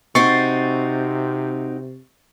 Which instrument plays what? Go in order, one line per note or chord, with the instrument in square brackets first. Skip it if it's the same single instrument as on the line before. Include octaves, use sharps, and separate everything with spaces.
[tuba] C3 [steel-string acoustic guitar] C4 D#4 F#4 [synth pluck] C#6 A6 C7